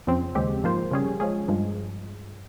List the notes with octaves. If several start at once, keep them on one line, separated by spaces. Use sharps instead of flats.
F2 C#3 F3 C4
D#2 C#3 G#3 C4 G4
G#2 F3 A#3 F4 C5
C#3 G3 C#4 G#4
F3 G#3 C#4 G#4
G2 F3 G#3